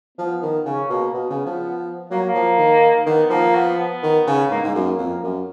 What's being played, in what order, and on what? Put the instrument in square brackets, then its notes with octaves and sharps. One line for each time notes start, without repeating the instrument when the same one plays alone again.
[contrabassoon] F3 [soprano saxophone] B3
[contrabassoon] D#3
[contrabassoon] C#3 [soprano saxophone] C#4
[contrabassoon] B2 [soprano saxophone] A#3
[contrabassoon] B2 [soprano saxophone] B3
[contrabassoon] C#3
F3
[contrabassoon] F#3 [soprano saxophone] A#3
[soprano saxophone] A#3
[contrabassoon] F3
D#3
[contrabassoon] D#3 [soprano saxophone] B3
[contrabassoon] F3 [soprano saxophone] A#3
[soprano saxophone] B3
B3
[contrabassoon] D#3
C#3
[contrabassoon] G#2 [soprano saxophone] A#3
[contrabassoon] G#2 [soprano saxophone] B3
[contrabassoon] F#2 [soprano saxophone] A#3
[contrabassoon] F2
F#2